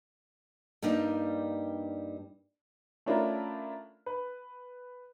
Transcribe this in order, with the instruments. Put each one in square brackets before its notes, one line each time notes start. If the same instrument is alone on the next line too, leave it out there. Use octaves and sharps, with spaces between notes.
[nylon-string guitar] G2 G3 A#3 D4 D#4
[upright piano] A3 C#4 D4 E4 F4 A#4
B4